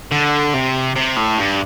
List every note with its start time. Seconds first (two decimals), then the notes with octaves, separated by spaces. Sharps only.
0.12 D3
0.54 C3
0.96 C3
1.17 A2
1.38 G2